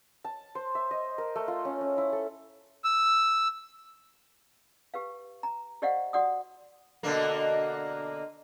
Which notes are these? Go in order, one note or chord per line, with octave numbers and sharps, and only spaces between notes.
A5
C5
E5
D#5
A#4
A3
F4
C#4
C#4
E4
A4
E6
G4 B4 F5
A#5
G4 C5 D5 D#5 F5 F#5
F#4 D5 F#5 D#6
B2 D3 A#3